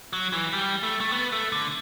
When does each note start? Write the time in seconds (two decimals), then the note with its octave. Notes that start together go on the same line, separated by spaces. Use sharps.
0.13 F#3
0.33 E3
0.53 G3
0.83 A3
1.01 A3
1.12 B3
1.32 A3
1.52 D3